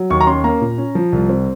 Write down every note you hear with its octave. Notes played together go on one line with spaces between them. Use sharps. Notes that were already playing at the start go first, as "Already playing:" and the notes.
Already playing: F#3
D#2 C#6
A#5
C#4 C6
A#3 A#5
A#2
C#4
F3
C2
C4